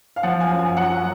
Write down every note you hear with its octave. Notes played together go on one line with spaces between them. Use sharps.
F5
F3 F#5
G#5
F#2
G#5
F#3 F#5